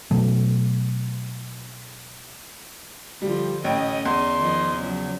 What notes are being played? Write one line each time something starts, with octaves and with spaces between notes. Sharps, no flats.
B2 F#3 A3
D3 F3 G3 F4
A1 C#4 D#5 G5
E2 C6
D#3 F3 D#5
C#3 F3 F#3